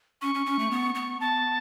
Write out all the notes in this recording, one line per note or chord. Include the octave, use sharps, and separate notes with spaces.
C#4 C#6
C#4
C#4
A3
B3
B3
B3 A5